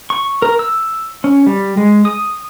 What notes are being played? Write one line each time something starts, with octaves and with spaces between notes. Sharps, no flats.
C#6
A#4
E6
C#4
G3
G#3
D#6